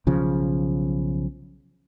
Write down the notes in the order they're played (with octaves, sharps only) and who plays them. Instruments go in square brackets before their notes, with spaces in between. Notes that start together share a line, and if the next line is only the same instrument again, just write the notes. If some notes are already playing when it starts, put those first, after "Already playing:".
[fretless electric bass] B1 C#3 F3